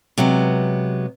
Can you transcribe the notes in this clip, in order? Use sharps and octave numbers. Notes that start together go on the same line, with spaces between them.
C3 F#3 G#3 B3